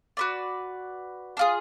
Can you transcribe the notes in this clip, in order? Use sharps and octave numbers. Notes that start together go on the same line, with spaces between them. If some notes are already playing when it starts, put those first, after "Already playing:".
F#4 B4 D5
D4 F4 G#4